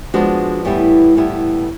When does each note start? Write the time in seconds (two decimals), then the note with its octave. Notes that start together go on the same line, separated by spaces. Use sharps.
0.14 F3 G#3 B3 D4 F#4
0.65 A2 E3 G3 B3 E4
1.15 A2 E3 G3 B3 E4